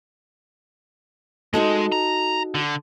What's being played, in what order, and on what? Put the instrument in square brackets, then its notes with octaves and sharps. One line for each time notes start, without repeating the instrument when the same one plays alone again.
[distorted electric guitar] G#3 [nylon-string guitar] D#4 F#4 A4
[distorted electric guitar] A#5
D3